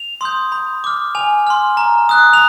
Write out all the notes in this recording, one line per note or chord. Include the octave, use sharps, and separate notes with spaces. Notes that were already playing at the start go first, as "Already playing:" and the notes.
Already playing: F7
C6 D#6 G6
B5
D6 F6
G#5 F7
C6 F6
A#5
D#6 F#6
F7